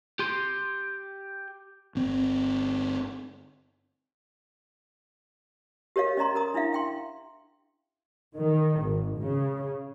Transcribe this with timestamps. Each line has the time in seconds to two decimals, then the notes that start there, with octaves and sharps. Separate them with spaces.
0.19 G4 C6
1.95 G1 C4
5.96 G4 A#4 C#5 D#5 F5
6.17 C#4 D5 D#5 A#5 C6
6.35 A#4 A#5 D#6
6.54 D4 E4 E5 F5
6.73 F5 G5 C6
8.35 D#3
8.81 G#1
9.18 C#3